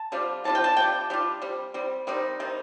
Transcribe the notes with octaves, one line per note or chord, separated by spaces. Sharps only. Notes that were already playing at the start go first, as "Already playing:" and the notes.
Already playing: A5
D3 G3 C4 F4
D3 G3 C4 F4 A5
G5
A5
G3 D4 F4 G5
G3 D4 F4
G3 C4
G3 C4
D#3 G3 C4 D#4
D#3 G3 C4 D#4